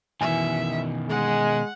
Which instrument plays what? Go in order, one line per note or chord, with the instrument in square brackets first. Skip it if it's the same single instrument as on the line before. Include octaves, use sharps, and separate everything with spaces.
[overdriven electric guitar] B2 D#3 [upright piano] E3 G#5 [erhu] E5
[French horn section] G#3 [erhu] F#5